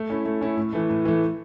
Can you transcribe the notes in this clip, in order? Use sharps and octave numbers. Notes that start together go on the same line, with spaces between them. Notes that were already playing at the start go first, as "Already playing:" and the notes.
Already playing: A3
C#4 E4 A4
A3
C#4 E4 A4
A2
E3 A3
A2
E3 A3